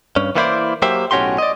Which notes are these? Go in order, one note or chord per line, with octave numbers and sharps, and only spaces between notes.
G2 C#4
E3 A#3 B3 E4 C5 D5
F#3 A#3 G4 C5 E5
B1 A2 C#4 F#4 G4 C6
D5 D#5